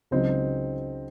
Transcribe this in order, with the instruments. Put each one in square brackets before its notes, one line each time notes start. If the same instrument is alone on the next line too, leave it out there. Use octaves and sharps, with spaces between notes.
[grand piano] C#2 C#3 F#3 C4 D#4